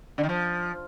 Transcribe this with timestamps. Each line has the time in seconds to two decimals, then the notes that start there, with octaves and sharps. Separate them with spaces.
0.18 D3
0.23 D#3
0.29 F3